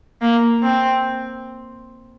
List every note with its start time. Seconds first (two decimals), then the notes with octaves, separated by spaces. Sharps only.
0.22 A#3
0.63 C4